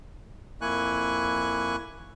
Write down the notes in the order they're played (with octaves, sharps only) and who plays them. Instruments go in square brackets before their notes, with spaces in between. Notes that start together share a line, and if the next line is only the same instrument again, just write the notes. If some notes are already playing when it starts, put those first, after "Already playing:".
[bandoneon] F2 A#3 E4 G#5 C#6 F#6